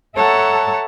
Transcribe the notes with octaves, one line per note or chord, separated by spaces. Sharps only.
A4 C#5 E5 F#5 A5 A#5